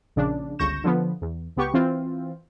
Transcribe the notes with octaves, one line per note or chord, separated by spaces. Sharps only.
A#1 C#3 D4
G1 C#2 C#6 G6 A#6 E7
D3 F3 B3
E2
C#2 B3 G4 C#6
E3 C4 F4